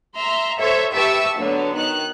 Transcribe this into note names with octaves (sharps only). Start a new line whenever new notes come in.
E5 A#5 C6
A4 C5 C#5 E5
G4 B4 E5 A5 C#6 E6
D3 F#3 B3
D#3 F#6